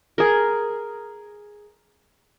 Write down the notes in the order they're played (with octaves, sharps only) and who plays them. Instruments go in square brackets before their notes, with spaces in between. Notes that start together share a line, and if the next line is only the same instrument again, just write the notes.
[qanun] G#4 A#4